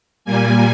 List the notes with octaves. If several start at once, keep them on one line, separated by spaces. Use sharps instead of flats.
A#2 G3 A#3 G#5